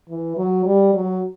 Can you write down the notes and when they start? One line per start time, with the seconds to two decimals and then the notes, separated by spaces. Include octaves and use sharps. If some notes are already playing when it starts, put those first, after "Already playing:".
0.09 E3
0.37 F#3
0.65 G3
0.94 F#3